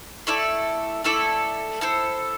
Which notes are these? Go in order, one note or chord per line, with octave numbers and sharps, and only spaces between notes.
A3 E4 A4 D5
A3 E4 A4 D5
E4 A4 C5